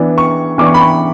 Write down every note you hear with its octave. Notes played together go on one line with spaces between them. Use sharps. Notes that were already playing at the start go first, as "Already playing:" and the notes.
Already playing: E3 B3 D4
C#6
E3 B3 D4 D6
C#6
B5
C#6